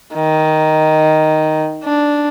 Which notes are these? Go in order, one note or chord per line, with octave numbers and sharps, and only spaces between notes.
D#3
D4